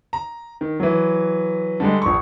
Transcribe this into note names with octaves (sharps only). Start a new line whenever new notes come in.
A#5
D#3
E3 F#3
D3 G3 G#3
A#1 C#6